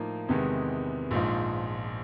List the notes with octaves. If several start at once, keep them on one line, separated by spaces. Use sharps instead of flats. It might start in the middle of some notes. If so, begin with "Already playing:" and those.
Already playing: A2 F3 A#3 D#4
E2 C3 D#3 G#3 B3
A#1 G#2 F3